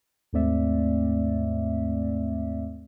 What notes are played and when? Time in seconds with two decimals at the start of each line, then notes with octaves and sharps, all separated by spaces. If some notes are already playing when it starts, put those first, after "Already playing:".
0.33 D#2 G#2 A3 C4 D5 E5